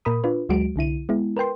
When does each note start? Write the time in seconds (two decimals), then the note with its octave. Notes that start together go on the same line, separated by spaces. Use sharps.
0.05 A#2 A#4 B5 D#6
0.24 D4 F4 B4
0.49 D2 F#3 G#3 F#4 D7
0.76 C2 D3 E4 D#7
1.09 G#3 B3 E4
1.37 A#4 B4 G5 C6